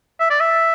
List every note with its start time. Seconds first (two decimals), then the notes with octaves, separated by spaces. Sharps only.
0.20 E5
0.30 D5
0.40 E5